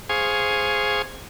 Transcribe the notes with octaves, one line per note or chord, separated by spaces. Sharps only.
G#4 C5 F5 G#5 C#6 D#6